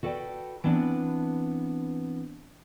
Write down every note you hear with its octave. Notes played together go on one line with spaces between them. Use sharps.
F#4 A4 B4 D5 G5
E3 B3 C4 D4